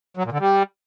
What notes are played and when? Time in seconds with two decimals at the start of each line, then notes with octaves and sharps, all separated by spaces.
0.17 F#3
0.25 A#2
0.32 D3
0.40 G3